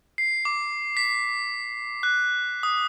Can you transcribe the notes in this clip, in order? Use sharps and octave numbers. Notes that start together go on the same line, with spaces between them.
C7
D6
B6
F#6
D#6